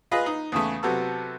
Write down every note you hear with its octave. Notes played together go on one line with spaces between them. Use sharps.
F4 G#4 B4 D#5
D#4
E2 C#3 A3
C3 F#3 B3 A4